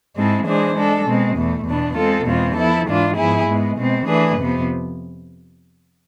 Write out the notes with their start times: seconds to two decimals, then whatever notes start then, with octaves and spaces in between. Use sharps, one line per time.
0.16 G#2 G#3 C4 E4 A4
0.45 E3 G#3 D4 G#4 C5
0.75 G#3 D4 A4
1.06 B2 G#3 C4
1.37 E2 B2 A3
1.66 E2 B2 B3 D4
1.96 G#3 C4 F4 A4
2.26 E2 B2 G#3 C4 F4
2.57 F3 B3 E4 A4
2.87 G#2 E3 G#3 D4 F4
3.17 G#2 F3 B3 E4 G#4
3.47 G#2 G#3 B3
3.78 B2 G#3 C4
4.07 E3 A3 D4 G#4 B4
4.38 F2 C3 F3 B3